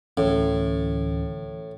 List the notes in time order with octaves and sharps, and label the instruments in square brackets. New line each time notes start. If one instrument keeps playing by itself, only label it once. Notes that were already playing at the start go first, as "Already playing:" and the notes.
[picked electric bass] D1 E3 C#4 [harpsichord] A2